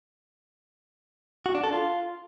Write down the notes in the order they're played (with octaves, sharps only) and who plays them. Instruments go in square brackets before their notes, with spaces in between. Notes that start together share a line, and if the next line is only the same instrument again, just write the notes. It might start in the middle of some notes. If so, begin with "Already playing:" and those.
[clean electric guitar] F#4
D4
A4
F4